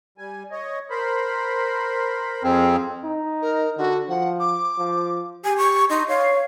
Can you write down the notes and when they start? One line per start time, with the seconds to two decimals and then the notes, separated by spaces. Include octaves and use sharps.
0.18 G3 G#5
0.51 C#5 D#5
0.90 A#4 C5 B5
2.43 F2 C4 G#4 F6
3.03 D#4
3.42 A#4
3.77 D3 F#4
4.09 F3 F#5
4.39 D6
4.78 F3
5.44 G4 G#5
5.58 C#6
5.90 D#4 C6
6.08 C#5 F5